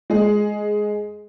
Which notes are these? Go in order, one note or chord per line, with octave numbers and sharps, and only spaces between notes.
G#3 G#4